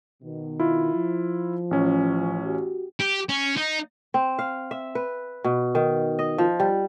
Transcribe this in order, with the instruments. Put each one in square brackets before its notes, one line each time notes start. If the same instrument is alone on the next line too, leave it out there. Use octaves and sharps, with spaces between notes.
[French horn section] B2 D#3
[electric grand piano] E4 F4
[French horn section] F3
[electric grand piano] A1 C#4
[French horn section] F#4 G4
[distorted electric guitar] G4
C#4
D#4
[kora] C4
F5
E5
B4
B2
D#3
D#5
F3
G3